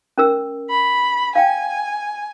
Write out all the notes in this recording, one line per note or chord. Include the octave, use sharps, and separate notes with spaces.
C#4 A#4 E6
B5
F5 G5 G#5